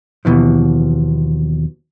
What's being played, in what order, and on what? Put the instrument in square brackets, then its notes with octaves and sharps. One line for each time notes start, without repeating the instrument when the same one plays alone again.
[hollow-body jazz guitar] D#2 B2 E3 F3